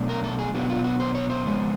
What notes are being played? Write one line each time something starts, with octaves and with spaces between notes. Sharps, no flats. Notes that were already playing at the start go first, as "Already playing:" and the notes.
Already playing: B2 F#3 A3 D4
A#4
A4
G#4
B2 F#3 B3 D4 G4
F4
F#4
C5
C#5
C5
F2 C#3 G#3 B3